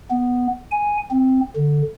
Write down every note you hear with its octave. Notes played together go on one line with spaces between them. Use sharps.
B3
G#5
C4
D3